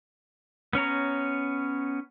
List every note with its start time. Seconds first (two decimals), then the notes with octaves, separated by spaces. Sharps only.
0.73 B3 C#4 C#5 A#5